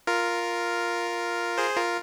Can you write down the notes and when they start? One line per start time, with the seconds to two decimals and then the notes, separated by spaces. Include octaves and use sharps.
0.07 F4 A#4
1.58 G#4 C5
1.77 F4 A#4